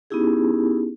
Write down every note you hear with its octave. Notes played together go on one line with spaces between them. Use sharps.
B3 C#4 D#4 E4 G4 G#4